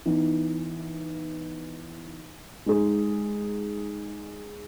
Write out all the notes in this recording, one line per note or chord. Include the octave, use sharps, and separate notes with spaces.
E3 B3 D#4
G#3 D#4 G#4